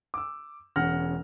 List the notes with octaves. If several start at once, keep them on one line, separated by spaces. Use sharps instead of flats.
D6 E6
E1 C#4 F#5 F6 A#6